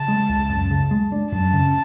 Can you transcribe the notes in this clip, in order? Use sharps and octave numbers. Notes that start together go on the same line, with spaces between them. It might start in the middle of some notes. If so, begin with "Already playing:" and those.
Already playing: C#3 A5
G#3
C#2
F#2
C#3
G#3
D4
F#2 A5
C#3